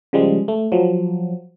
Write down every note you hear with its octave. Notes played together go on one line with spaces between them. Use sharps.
C#3 F3 G3 G#3
A3
F3 F#3